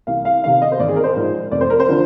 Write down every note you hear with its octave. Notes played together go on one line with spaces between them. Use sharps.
C2 F5
F5
C3 D#3 F5
D#5
C5
G#1 D5
G#4
A#4
C5
G#2 F3
F1 D5
C5
A#4
C5
D3 F3